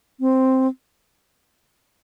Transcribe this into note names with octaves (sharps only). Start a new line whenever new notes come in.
C4